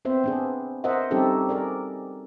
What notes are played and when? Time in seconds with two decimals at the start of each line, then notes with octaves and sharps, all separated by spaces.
0.05 B3 C4 C5 E5
0.24 B3 D4 G#4
0.84 A#4 C5 D#5 E5 F#5
1.11 G3 C4 C#4 D#4 G4 A4
1.49 G#4 A#4 D5